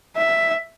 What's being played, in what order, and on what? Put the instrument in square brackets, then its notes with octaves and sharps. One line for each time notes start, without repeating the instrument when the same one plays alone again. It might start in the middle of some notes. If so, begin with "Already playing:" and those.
[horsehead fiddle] E5